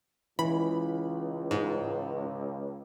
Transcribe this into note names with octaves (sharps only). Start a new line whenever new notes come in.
C#2 E3 B5
G#2